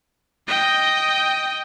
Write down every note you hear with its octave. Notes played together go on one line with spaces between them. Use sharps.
D#5 G5